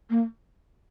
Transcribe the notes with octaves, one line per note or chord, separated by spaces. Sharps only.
A#3